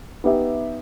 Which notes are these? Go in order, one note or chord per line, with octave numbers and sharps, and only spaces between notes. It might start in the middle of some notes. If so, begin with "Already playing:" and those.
B3 D#4 G4 B4 E5